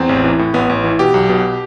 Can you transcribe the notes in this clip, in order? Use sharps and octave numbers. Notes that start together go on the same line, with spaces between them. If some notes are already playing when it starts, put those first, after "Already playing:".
Already playing: E2 C4
A1
E3
A2
A1 B3
A1
E3
B2 G4
B1
B2